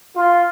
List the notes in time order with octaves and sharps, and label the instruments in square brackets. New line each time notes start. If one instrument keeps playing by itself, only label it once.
[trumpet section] F4